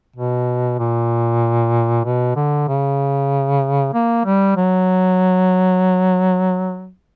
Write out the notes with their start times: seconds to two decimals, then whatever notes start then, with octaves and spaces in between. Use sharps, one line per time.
0.16 B2
0.79 A#2
2.05 B2
2.36 D3
2.68 C#3
3.94 A#3
4.25 G3
4.57 F#3